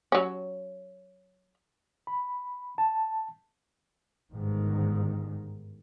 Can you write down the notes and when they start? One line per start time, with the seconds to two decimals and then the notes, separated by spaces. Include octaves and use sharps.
0.12 F#3 C#4
2.07 B5
2.78 A5
4.33 G1 G#2 D#3